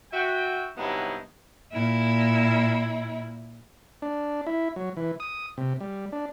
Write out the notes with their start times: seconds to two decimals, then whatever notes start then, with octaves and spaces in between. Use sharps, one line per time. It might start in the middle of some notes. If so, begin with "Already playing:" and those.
0.12 F#4 E5 G5
0.76 G2 C3 F#3 B3 D#4 E4
1.73 A#2 E4
4.02 D4
4.47 E4
4.76 F#3
4.97 E3
5.20 D#6
5.58 C3
5.80 G3
6.12 D4